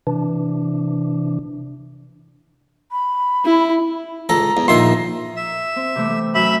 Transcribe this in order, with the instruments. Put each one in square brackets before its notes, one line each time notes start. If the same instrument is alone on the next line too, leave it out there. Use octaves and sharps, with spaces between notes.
[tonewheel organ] C3 E3 D4
[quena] B5
[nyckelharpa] E4
[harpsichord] C#2 A4 [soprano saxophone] A#5
[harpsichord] E2
[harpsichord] A#1 D#3 E5 [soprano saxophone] C6
[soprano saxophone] A#5
[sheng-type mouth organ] E5
[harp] C4
C3 E3 A3
A3
[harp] F#2 [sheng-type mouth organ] E5 B5